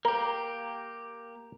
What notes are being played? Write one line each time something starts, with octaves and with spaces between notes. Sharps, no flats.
A#3 G4 A#4